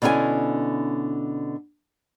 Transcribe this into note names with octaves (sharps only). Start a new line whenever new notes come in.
B2 D3 C#4 E4 G#5